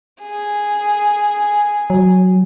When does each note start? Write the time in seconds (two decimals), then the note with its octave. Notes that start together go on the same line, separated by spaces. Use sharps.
0.21 G#4
1.90 F#3